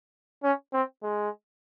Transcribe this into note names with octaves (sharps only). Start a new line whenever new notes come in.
C#4
C4
G#3